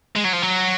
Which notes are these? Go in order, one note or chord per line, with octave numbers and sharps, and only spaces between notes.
G#3
F#3
F3
F#3